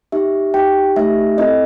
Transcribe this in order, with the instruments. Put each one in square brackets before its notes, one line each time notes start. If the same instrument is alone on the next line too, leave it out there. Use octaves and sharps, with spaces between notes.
[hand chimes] D#4 G4 E5
D#4 G4 G5
A3 D#4 G4 E5
C4 E4 A4 D#5